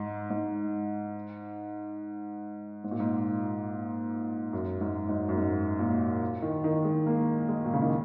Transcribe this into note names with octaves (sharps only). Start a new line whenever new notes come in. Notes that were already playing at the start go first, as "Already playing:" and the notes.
Already playing: G#2
G#2
G#2
A#2
G#2
F#2
G#2
G#2
F#2
G#2
A#2
D#3
D#3
G#3
A#3
G#3
A#2
C#3
D#3